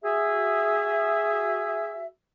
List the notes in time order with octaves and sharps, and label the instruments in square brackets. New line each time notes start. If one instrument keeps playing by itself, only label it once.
[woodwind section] F#4 G#4 E5